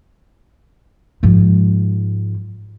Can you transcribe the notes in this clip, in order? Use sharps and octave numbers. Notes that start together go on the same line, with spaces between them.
G#2 F3